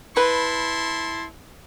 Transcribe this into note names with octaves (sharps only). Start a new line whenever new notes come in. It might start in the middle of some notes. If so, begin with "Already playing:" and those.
E4 B4 A5 C6